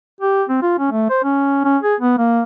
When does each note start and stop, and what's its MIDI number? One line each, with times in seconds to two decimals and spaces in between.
0.20 0.43 67
0.49 0.60 60
0.62 0.77 65
0.79 0.89 61
0.91 1.08 57
1.10 1.22 72
1.24 1.63 61
1.65 1.78 61
1.83 1.95 68
2.00 2.16 59
2.18 2.43 58